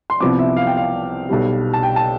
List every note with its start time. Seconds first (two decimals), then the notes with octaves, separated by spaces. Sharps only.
0.10 C6
0.20 C2 C3 F3 B3 D6
0.39 E5
0.57 F5
0.67 G5
0.77 F5
1.29 B1 B2 G3
1.73 A5
1.83 G5
1.96 A5